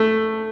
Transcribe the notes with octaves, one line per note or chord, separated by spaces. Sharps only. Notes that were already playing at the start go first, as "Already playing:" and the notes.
Already playing: A3